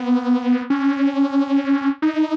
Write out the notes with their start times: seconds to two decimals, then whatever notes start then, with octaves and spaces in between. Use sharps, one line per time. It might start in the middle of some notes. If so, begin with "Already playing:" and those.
Already playing: B3
0.70 C#4
2.02 D#4